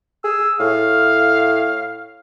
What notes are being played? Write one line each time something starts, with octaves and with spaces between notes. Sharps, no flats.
G#4 E6
A2 F5